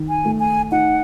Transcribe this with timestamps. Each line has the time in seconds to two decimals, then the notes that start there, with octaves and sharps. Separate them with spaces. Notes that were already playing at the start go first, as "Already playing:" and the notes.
Already playing: D#3
0.09 G#5
0.25 A3
0.40 G#5
0.71 D#4 F#5